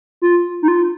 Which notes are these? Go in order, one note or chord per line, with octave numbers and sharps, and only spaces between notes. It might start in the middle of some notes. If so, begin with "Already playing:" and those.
F4
D#4
F4